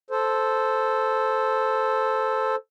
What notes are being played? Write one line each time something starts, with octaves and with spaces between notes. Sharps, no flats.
A4 C5